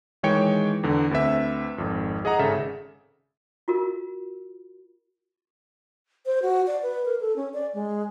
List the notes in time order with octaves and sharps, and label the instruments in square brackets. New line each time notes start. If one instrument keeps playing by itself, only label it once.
[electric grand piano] D#3 E3 G#3 C#5 G5 C#7
E2 D3
D2 C4 B4 E5
G#1 F2
G#4 D#5 F#5 A#5
G#1 C#3 A4 E5
[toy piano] F4 F#4 A#4
[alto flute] C5
F#4
D5
B4
A#4
A4
C#4
D5
G#3